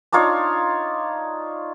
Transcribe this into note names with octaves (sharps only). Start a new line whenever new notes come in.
D4 D#4 F4 C#5